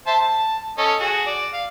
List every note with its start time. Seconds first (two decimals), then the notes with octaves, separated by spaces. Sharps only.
0.07 C5 E5 A5
0.22 A5
0.78 C#4 A4 D#5
1.00 F#4 G#4
1.26 D5
1.53 F5